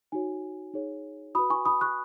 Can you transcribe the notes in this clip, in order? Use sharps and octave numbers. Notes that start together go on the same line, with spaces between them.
D#4 F#4 C#5 G#5
D#4 G#4 C#5
F#4 B4 B5 D#6
G#5 C#6
B5 D#6
C#6 F#6